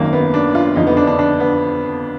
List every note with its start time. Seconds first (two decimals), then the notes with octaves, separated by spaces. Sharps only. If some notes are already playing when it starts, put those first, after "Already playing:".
Already playing: G#1 F#2 D#3 A#3
0.13 B3
0.34 D4
0.55 F4
0.76 F2 D3 F3 D#4
0.87 B3
0.97 D4
1.07 D4
1.19 D4
1.40 B3